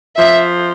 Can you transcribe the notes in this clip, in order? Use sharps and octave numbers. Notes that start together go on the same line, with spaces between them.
F3 E5